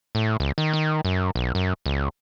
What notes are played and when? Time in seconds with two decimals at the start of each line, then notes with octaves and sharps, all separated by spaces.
0.15 A2
0.40 C#2
0.58 D#3
0.73 D#3
1.05 F#2
1.35 B1
1.55 F#2
1.86 C#2